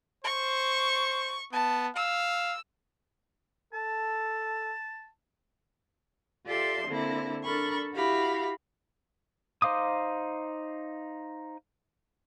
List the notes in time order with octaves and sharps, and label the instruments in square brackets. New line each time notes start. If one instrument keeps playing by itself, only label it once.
[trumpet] C5 [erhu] C#6
[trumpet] B3 [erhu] A5
[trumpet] F5 [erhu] E6
[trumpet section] A4 [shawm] A5
[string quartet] F4 G4 A4 D5 E5 C6
D3 A#3 C4 D4 E4
D4 A4 A#4 B5 C#6
E4 F#4 G4 F5 B5
[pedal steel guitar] D#4 C5 F5 D6 D#6